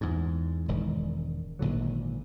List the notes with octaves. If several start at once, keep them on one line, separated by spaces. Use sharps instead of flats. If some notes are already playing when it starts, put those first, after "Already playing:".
E2 G#2
E1 G#2 D#3
G#1 A#2 D3 F#3